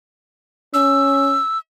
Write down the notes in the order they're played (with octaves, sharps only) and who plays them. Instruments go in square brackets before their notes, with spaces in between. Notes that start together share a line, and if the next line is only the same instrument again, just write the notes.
[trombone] C#4 [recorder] E6